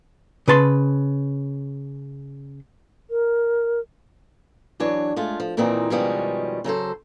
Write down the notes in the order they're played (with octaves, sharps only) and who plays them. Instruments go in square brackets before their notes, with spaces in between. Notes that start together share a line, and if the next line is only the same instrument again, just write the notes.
[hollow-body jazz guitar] C#3 B4 A5 C6
[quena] A#4
[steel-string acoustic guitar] E3 F#3 D4 C#5
G#3 A3 F4
F3
F2 A#2 D#3 E3 C4 D#4
B2 D#3 F3 G3 G#3 C#4
C#3 F#3 A4 C5